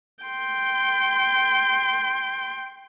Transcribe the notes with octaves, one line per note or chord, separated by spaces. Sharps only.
G5 C6